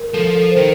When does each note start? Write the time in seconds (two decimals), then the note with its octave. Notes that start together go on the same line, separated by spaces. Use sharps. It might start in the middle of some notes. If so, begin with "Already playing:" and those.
Already playing: A#4
0.14 F3 A4
0.35 A4
0.51 C5
0.56 D#3 A#4